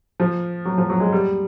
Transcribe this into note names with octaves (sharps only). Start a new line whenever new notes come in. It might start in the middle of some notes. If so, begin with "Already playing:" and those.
F3
F#3
F3
F#3
G#3
G3